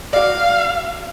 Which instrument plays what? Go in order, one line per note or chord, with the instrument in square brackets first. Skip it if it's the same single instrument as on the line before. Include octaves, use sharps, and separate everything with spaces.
[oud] F#4 D5 [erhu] F5